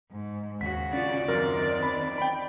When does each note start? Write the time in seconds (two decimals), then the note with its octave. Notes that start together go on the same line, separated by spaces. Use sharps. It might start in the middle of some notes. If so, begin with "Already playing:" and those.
0.12 G#2
0.61 D#2 C#3 F#4 B6
0.93 C#4 F4 D5
1.28 F#2 D#3 C4 A#4
1.83 B5
2.18 G5 B5